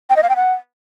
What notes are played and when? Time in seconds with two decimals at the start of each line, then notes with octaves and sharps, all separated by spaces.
0.10 G5
0.16 D#5
0.23 F5
0.29 G5
0.36 F#5